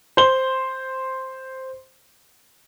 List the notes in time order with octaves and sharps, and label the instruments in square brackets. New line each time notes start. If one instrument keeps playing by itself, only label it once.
[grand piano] C5 G7